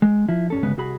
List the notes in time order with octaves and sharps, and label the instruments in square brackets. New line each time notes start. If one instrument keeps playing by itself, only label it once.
[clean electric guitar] G#3
F3 E4
G2 C#4 A4
D2 G2 C#3 G#3 B3 B4
C2 F#4 G#4 B5